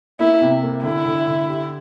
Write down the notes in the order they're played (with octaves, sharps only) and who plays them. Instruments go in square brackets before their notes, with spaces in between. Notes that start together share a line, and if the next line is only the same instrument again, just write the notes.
[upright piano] A#3 [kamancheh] E4
[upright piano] C3
A#3
[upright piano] D3 [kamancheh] E4
[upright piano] D3
D3
G4